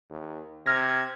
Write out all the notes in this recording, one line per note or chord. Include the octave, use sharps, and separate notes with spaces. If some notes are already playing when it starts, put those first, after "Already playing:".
D#2
C3 F6 G#6 A#6